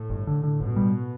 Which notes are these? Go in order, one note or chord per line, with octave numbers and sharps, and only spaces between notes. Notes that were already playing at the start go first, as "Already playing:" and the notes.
Already playing: A2
G1
D3
D3
G1 B2
G3